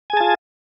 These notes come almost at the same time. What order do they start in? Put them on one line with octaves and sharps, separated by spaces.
G#5 G#4 A5 F4